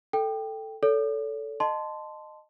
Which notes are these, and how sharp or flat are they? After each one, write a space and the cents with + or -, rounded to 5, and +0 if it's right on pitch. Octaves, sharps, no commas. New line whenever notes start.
A4 +0 G5 +0
A4 +0 C#5 +40
D#5 -15 A5 +0 C6 -10